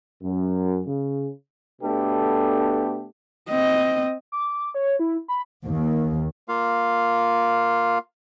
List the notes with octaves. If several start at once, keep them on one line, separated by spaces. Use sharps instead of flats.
F#2
C#3
B2 A3 B3 D4 G4 A4
C4 D#5
D6
C#5
E4
B5
D#2
A#3 F4 F5